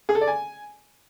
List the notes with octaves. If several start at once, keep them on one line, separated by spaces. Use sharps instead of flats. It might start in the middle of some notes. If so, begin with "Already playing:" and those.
G#4
A4
D5
G#5